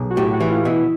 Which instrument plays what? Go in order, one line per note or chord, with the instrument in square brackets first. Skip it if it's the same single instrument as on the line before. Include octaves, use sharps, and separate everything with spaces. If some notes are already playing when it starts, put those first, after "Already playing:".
Already playing: [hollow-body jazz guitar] B1 [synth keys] G#4
[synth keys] F#4
[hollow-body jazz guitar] A2 [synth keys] G4
[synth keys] F#4
[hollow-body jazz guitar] E3
[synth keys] F4
[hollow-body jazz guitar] B2 [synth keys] E4